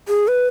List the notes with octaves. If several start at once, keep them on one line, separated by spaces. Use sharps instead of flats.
G#4
B4